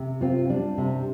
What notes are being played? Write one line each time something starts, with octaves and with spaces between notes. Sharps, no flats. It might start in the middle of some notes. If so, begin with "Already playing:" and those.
Already playing: C3
C4 F4
G3 D4
C3